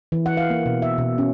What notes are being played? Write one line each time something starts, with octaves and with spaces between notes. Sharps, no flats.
E3
F#5
F5
A#3
B2
E5
B2
C#4